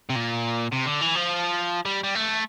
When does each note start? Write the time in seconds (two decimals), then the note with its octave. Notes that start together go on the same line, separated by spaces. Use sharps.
0.10 C3
0.16 A#2
0.72 C3
0.86 D3
1.01 E3
1.15 F3
1.85 G3
2.04 G3
2.15 A3